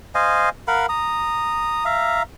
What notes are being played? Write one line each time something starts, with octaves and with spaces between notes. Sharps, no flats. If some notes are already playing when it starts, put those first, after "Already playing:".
C5 D#5 F5 G#5
A#4 F5 F#5 B5
A#5 D#6
E5 F5 A#5